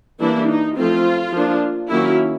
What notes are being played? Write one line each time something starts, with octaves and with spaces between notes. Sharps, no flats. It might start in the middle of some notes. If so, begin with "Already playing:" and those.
E3 G3 A#3 D4 E4
D#4
F3 A3 C4 F4
F3 A#3 D4
D#3 F#3 A#3 C#4 E4